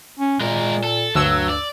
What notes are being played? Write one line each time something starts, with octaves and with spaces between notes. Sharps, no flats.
C#4
A#2 G#3 A#4
A4
D2 G2 F#3 E6
D5